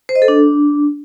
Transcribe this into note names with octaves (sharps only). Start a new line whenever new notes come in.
C5
D#5
A4
D4